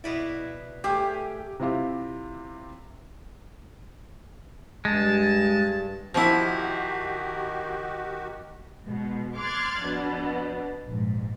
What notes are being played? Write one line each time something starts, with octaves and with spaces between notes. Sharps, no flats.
B2 E4 B4 D5
A3 G4 G#4 F5
C3 C4 E4 F4 G4
G2 G#3 A5
D#3 F3 E4 F#4 G4
B2 G#3
C6 D6 F6 F#6 G#6 A6
F2 B2 D4
A#1 G#2